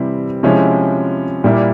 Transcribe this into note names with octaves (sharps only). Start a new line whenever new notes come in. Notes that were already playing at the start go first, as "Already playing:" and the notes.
Already playing: C3 E3 G3 C4 E4
C3 F3 G#3 C#4 E4
A#2 G3 A#3 E4